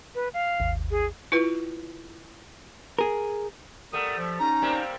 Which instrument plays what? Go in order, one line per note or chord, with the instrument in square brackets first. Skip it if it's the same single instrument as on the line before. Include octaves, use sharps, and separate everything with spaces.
[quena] B4
F5
[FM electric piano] G#1 D#2
[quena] G#4
[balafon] E4 F4 B4
[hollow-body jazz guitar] G#4 A#4
[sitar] G3 A3 [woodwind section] A#4 F#5 D#6
[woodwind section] F3
[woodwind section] C#4 D#4 [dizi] A#5
[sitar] G3 A#3 C4